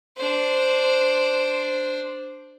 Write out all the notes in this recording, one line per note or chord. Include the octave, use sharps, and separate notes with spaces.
D4 C5